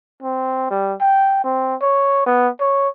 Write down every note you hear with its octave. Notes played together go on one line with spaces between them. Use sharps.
C4
G3
G5
C4
C#5
B3
C#5